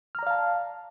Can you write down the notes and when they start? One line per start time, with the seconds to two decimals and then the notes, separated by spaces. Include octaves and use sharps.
0.15 F6
0.19 A#5
0.23 D5
0.27 F5
0.31 A5